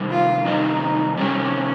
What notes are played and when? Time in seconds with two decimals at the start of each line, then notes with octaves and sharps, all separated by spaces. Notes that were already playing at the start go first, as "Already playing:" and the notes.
Already playing: C3 D#3 G3
0.10 F4
0.45 C3 D#3 G3 D#4
1.17 C3 D#3 G3 C#4